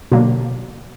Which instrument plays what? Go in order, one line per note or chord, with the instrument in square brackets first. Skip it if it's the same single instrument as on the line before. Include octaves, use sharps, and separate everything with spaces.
[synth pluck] B2 [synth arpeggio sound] D3 F#3 A#3 D4